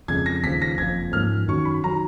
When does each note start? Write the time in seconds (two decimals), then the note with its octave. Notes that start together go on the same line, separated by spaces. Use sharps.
0.08 F2 C#3 G#3 G#6
0.26 A#6
0.43 D#2 C#3 F3 B6
0.62 A#6
0.78 F#1 F2 F3 G#6
1.13 G#2 F3 A#3 C#4 F6
1.48 F#2 D#3 F#3 C#4 C#6
1.65 B5
1.84 D#3 F#3 A#5